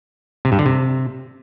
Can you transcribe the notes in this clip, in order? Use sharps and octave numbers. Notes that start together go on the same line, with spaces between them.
C3
G2
D3
C3